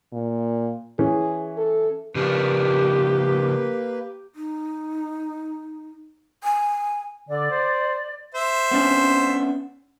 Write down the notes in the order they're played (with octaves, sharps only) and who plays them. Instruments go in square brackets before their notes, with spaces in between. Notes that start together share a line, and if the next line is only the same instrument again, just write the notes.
[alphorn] A#2
[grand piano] E3 C#4 [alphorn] G#4
[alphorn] A4
[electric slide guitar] C#3 F3 D4 [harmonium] A#3 B4 [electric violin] G4
[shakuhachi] D#4
G#5
[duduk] D3 [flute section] D5
[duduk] C5
[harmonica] C5 E5
[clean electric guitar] B3 C#4 D4